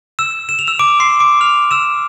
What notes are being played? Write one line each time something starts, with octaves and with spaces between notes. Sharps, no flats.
E6 E7
E7
F7
E6 E7
D6 D7
C6 C7
D6 D7
F6 F7
E6 E7